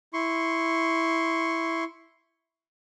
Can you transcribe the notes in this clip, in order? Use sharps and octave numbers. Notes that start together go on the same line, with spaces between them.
E4 C6 C#6